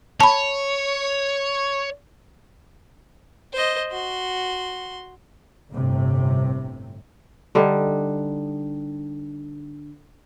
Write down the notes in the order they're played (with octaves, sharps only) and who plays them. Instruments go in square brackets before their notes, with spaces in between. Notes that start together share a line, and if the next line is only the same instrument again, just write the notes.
[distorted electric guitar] C#5 [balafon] A5 B5
[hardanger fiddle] C5 D#5
F#4 C6
[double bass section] G1 A2 C3
[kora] D3 G3 D#4